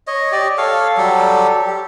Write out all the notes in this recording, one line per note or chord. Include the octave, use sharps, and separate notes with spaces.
C#5 D#5
G4 D5 D#5
A4 C#5 F5
F#3 G3 G4 A4
G4